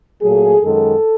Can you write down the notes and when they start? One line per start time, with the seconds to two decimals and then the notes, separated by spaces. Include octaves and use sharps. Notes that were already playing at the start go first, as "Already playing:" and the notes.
0.22 A#2 F#3 A3 G#4
0.62 F#2 D#3 G#3 A4